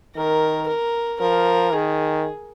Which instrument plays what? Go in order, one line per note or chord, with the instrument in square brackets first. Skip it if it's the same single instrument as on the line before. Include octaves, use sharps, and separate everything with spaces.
[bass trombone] D#3 [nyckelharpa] A#4
[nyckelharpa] A#4
[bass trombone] F3 [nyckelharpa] A#4
[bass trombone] D#3 [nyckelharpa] G#4